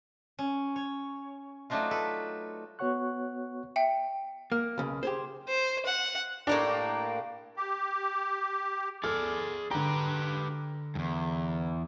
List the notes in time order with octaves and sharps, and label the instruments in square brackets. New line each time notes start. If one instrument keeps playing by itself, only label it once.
[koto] C#4
C#5
F#3 A3 D4 D#4 F4
A4 B4
[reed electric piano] B3 F#4 C#5 F#5 C#6 F#6
[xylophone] E5 G5 C#7
[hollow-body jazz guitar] A#3 [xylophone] F6
[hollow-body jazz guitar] B1 C#3
G4 G#4 C5
[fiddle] C5
F#5
[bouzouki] A2 A#3 G4 [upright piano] D4
[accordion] G4
[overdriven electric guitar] G#4 D5 [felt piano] A4 F6
[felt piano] D3 A#5 [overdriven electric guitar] G4 B4
[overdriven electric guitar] E2 G2